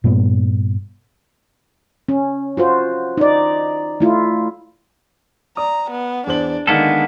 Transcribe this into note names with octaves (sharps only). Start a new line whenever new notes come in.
G2 A#2 G3 B3
C#4
F4 F#4 C5
D#4 D5
A3 E4 F4
D5 A#5 D#6
B3
E2 D4 C5 F#7
D3 D#3 G#3 A#3 B3 A4